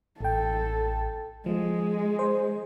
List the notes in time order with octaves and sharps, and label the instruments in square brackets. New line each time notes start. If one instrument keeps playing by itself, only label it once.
[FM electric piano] A1 G5 [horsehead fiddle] A4
[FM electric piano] F3 [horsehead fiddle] G#3
[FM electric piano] C5